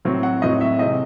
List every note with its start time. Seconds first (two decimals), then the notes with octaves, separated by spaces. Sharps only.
0.05 A2 F#3 C4
0.23 F#5
0.42 A2 F#3 C4 D#5
0.61 E5
0.79 C3 E3 G#3 C4 D#5